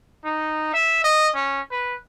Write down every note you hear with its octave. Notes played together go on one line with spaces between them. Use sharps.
D#4
E5
D#5
C#4
B4